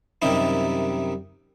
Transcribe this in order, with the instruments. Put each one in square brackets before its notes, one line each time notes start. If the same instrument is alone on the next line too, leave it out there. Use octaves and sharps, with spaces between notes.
[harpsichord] F#2 C3 D#3 G3 D#4 E4